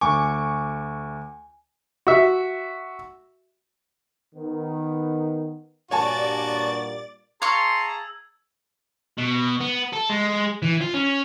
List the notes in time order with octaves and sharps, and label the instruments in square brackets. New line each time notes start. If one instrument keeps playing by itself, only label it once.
[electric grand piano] D2 C#6 D6 [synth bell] G#5
[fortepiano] F#4 E5
[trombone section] D#3 B3
[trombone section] G2 A#2 [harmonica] F#4 [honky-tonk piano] C#5 G#5 A5 [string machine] D5 A6
[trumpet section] G#4 A5 A#5 [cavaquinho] F5 C#6 [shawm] C6 [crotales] E6 G#6
[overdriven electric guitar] B2
B3
A4
G#3
E3
F4
C#4